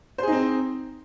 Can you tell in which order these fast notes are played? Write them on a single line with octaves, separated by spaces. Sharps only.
C5 G#4 D#4 C4